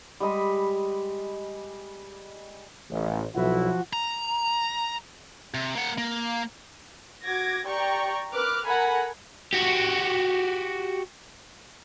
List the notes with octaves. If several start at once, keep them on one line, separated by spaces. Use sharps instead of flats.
G3 G#3 D#5 B5
A1
B1 F3 E4 F#4
A#5
C3
A#3 F#5
A#3
F#4 D6 G#6 A#6
G4 D5 G5 A#5 C#6
A#4 B4 D6 F6 F#6
A4 A#4 F#5 G#5 A#5 B5
F#4 G4